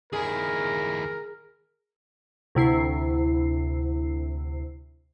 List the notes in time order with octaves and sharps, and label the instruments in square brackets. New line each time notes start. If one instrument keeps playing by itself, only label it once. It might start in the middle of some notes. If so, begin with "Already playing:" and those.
[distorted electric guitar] D#2 E4 [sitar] G#4 [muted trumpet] A#4
[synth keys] D2 C3 E4 C7